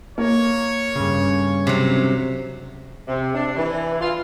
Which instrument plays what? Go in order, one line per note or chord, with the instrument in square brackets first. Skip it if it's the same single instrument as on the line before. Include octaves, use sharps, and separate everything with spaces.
[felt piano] A#3 [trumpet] C#5
[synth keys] G2 C#3
[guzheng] C3 F#3
[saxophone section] C3
D4
E3
F4